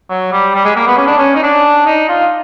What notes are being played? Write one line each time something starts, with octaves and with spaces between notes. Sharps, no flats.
F#3
G3
G3
G#3
A#3
B3
C#4
D4
C#4
D#4
D4
D#4
F4